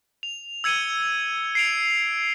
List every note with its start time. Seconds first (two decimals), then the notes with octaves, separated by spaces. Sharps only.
0.23 F7
0.64 E6 G#6 C#7 D#7 F7 G7
1.55 C7 D7 F7